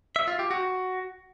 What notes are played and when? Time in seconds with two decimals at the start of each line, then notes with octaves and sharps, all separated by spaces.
0.16 E5
0.28 F4
0.39 G4
0.51 F#4